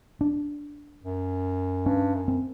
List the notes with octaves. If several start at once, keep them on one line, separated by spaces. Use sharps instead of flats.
D4
F#2
G2 C#4
F#2
C4